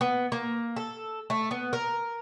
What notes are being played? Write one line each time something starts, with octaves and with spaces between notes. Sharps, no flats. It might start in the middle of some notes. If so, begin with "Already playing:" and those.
B3
A#3
A4
A3
B3
A#4